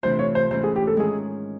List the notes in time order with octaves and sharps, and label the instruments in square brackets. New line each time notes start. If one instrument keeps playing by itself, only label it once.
[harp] C3 E3 A3 D4 F4 [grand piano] C5
[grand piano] C#5
C5
[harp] G#2 E3 A3 C#4 [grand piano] C5
[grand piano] G#4
G4
A4
[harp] D#3 G#3 C#4 [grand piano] G#4